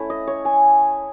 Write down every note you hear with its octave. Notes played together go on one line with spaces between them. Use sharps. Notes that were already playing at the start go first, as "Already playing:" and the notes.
Already playing: A3 C#4 E4
D#5
C#5
G#5